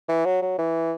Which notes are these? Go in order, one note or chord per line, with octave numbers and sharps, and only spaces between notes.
E3
F#3
F#3
E3